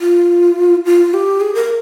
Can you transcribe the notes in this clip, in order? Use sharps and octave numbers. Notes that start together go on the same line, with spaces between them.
F4
F4
G4
G#4
A#4